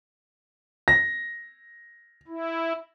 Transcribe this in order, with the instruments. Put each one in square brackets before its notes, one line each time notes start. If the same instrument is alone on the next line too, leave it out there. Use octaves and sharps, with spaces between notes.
[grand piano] A#6
[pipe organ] E4